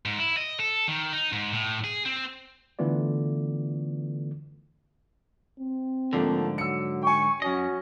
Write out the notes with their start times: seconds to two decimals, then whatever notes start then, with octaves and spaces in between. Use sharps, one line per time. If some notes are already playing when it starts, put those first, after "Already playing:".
0.05 G#2
0.19 E4
0.37 D#5
0.60 A4
0.88 D#3
1.13 D#4
1.32 G#2
1.53 A2
1.84 G#4
2.06 C4
2.79 D3 E3 A3 B3 F4 D5
5.60 C4
6.13 G#2 D3 F3 A3 A#3
6.58 F#3 E6 C#7
7.03 G5 G#5 C#6
7.42 F#2 C#4 F#4 D#5